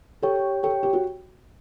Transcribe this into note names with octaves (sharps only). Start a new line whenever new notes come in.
G4 A4 C#5 G5
G4 A4 C#5 G5
G4
F#4